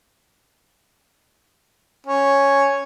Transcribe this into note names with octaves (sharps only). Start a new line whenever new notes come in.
C#4